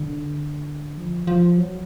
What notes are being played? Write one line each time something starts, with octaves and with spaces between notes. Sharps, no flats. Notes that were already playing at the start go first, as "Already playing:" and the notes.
Already playing: D3
F3
F3
F#3